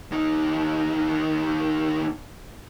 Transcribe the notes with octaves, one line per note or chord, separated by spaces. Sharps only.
D#2 D#4